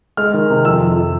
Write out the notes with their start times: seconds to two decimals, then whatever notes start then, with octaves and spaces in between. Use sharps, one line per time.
0.17 G#3 F6
0.34 D#3
0.50 C3
0.65 F2 E6
0.81 F2